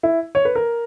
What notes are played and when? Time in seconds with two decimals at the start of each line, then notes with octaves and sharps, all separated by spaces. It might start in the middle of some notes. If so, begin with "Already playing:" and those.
0.03 E4
0.35 C#5
0.45 B4
0.55 A#4